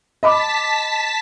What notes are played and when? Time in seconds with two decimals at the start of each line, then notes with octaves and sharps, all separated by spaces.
0.23 D#5 A5 B5 D6 B6